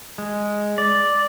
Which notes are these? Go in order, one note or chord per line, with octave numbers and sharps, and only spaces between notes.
G#3
D5